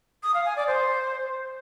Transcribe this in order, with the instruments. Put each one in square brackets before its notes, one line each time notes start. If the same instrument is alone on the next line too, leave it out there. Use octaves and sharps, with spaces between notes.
[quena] D#6
F5
G#5
D5
C5